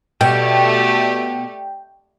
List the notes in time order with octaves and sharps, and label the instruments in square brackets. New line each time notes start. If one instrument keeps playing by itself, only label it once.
[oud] B2 [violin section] A3 G4 D5 [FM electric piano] G5